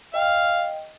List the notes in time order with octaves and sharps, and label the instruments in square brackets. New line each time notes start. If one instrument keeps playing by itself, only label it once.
[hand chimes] D#5 G5 [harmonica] F5